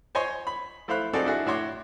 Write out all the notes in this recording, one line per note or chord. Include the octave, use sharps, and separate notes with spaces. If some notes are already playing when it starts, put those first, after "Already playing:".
C5 C#5 D#5 G#5 C6
B5
A3 E4 C5 F5 B5 F#6
C4 D#4 F#4 G#4 A4 D5
D4 E4 F#4 G#4
A2 E4 F#4 C#5 C6 D6